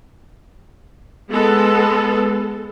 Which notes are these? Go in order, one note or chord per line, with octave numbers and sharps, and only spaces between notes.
G#3 B3 A4